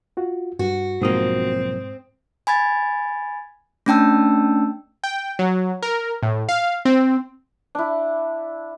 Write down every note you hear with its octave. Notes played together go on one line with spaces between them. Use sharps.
F4 F#4
G2 F#4
B1 G#2 F3 A#3 C4 D#6
G#5 B5 G#6 A6
A3 C#4 D4 G5 A5 E6
G5
F#3
A#4
A2
F5
C4
D4 E4